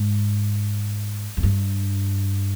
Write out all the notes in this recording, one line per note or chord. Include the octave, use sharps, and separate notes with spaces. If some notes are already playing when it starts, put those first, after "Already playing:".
Already playing: G#2
F2
G2